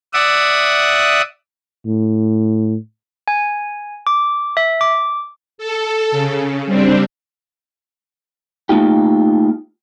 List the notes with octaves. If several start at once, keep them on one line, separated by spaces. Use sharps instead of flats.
D5 E5 F#5 D#6
A2
G#5
D6
E5
D6
A4
C#3
G3 C4 D4
A3 A#3 D#4 F4 G4